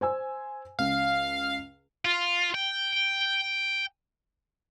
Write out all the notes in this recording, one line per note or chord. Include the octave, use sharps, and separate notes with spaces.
C5 G#5 E6
C#2 F5
F4
G5